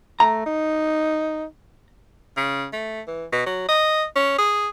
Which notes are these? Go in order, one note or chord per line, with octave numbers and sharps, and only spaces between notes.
A3 A#5
D#4
C#3
A3
E3
B2
F#3
D#5
C#4
G#4